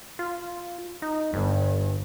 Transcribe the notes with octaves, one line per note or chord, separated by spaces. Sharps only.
F4
D#4
G1 G2